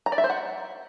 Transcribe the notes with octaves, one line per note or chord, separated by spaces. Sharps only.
A#5
D5
E5
C5
F#5